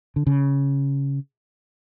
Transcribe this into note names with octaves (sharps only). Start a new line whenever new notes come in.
D3
C#3